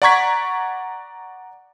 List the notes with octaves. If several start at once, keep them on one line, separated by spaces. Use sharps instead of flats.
D5 F#5 A#5 C#6 G#6 B6